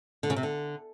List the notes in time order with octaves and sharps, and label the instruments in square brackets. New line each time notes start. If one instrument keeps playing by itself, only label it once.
[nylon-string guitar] D3
C#3
C3
D3